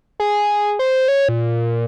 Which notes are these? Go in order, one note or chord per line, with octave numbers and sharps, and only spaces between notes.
G#4
C5
C#5
A#2